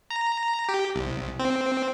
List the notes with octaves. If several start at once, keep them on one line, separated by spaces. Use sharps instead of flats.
A#5
G4
C2
C4